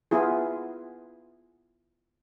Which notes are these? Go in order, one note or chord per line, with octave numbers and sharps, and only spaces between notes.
B3 E4 F4 G#4